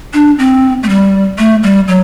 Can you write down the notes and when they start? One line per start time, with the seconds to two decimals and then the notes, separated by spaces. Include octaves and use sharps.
0.14 D4
0.39 C4
0.83 A3
0.89 G3
1.38 A3
1.63 G3
1.88 F#3